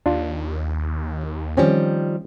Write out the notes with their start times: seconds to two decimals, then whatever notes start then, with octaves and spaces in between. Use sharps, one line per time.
0.06 D#2 D4 F4
1.57 D#3 F3 G3 C4 C#4